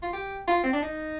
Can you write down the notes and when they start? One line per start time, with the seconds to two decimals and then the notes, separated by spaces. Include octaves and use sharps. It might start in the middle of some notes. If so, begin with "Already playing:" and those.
0.02 F4
0.13 G4
0.48 F4
0.64 C4
0.73 D4
0.82 D#4